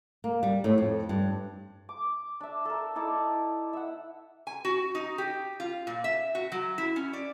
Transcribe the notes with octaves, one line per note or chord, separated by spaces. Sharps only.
A#3
G3
A2
F2
G2
D6
D4 E5
A4 A#4
D#4 E4 A4 D5
E5 F#5
G#5
F#4
D#4
G4
F4
A#2
E5
F#4
F#3
E4
C#4
D5